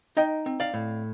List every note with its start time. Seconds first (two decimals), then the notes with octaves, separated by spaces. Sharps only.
0.17 D#4 D#5 G5
0.46 C4
0.60 D5 F5
0.74 A2